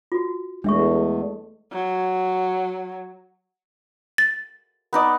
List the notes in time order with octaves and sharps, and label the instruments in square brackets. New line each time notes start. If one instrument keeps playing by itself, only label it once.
[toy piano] F4 F#4
[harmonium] E2 [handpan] G#3 A3 [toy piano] D4 E5 C#6
[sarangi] F#3
[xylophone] A6
[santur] B3 D#4 D5